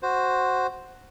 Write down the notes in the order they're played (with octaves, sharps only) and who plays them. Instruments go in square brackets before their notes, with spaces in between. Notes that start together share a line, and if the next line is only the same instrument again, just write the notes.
[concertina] F#4 C5